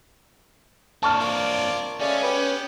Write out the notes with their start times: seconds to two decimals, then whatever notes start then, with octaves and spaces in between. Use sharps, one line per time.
1.03 C4 D4 A5 C#6 F6
1.19 F4 A#4 D5
2.00 G#3 A3 C#4 D5 F5
2.23 B3 G4 B4